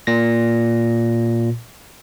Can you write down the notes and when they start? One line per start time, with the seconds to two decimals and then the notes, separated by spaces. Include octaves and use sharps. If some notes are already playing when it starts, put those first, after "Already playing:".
0.07 A#2 A#6